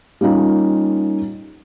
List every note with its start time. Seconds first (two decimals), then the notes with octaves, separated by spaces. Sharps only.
0.21 G3 A#3 C#4 D#4 F4